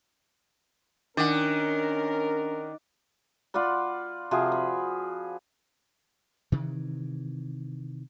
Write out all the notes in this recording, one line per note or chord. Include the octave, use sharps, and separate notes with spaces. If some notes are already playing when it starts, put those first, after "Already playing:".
D#3 C#4 D4 A#4 D5 F#5
F4 D5 F#5 B5
C3 F3 F#4 G#4
B5
C3 D#3 E3